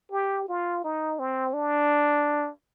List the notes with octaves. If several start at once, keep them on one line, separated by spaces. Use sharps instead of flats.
G4
F4
D#4
C4
D4